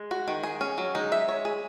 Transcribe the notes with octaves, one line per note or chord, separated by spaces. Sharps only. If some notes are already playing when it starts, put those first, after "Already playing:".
Already playing: G#3
F#4
D#3
G#4
C#4
F#3
G#3 D#4
E5
C#5
G#4